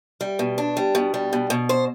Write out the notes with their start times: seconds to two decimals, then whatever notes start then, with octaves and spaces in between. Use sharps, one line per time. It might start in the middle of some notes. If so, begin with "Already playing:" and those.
0.21 G3
0.39 B2
0.58 D4
0.77 G3
0.95 B2
1.14 G3
1.33 B2
1.50 B2
1.69 C5